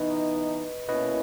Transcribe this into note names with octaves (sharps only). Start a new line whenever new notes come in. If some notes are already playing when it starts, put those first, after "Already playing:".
Already playing: E3 B3 D#4 B4 D#5
B2 A#3 C#4 E4 B4 D#5